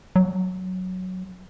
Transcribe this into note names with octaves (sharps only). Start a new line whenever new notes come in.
F#3